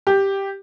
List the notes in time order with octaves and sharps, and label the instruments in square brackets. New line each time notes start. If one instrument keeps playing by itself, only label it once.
[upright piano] G4